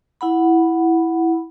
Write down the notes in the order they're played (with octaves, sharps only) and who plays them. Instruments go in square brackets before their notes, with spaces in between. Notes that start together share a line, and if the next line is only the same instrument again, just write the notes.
[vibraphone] E4 F#5 B5